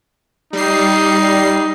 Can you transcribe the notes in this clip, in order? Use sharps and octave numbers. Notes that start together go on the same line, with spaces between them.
G3 D#4 C7